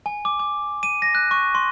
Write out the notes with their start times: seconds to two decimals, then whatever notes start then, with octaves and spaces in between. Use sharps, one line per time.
0.06 G#5
0.25 D6
0.39 D6
0.83 D#7
1.02 A#6
1.15 F#6
1.31 C#6
1.55 C6